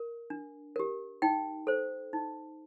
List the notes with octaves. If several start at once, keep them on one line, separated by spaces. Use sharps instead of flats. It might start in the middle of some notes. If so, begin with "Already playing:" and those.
Already playing: A#4
D4
G4 A#4
D#4 G5
A4 C5
D#4